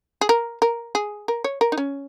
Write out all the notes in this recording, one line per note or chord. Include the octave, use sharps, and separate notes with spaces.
G#4
A#4
A#4
G#4
A#4
C#5
A#4
D#4
C#4